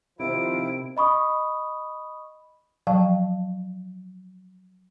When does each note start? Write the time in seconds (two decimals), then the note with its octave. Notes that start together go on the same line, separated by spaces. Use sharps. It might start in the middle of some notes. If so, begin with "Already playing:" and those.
0.19 C3 D#3 F3 E4 D7
0.97 D#5 B5 C#6 D#6
2.87 F3 F#3 F5 G5 A5 C#6